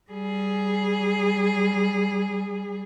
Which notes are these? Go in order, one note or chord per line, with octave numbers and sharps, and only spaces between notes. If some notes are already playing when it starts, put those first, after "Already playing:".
G3 G#4